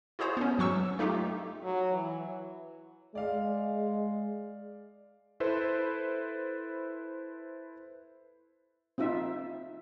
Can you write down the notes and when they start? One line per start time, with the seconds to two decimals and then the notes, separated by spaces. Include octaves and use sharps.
0.19 E4 F#4 G#4 C5 C#5
0.37 B3 C#4
0.58 G2 F#3 C#6 E6
0.99 A3 D#4 F4 G4
1.63 F#3
1.93 E3
3.15 G#3 D5 F5
5.40 E4 A4 B4 C5
8.98 C4 D#4 F4 E5